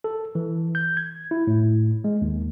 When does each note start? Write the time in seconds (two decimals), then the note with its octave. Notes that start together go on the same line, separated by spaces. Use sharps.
0.04 A4
0.35 E3
0.75 G6
0.97 G#6
1.31 E4
1.47 A2
2.04 G#3
2.22 D#2